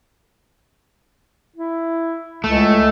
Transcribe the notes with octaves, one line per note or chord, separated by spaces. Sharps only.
E4
C#2 A3